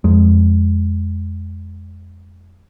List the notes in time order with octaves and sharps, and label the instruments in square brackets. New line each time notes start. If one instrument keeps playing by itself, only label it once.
[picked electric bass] F2 G#3